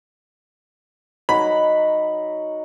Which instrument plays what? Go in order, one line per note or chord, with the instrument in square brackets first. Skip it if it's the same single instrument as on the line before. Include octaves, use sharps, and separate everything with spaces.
[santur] F#3 D#4 F#5 [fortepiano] B5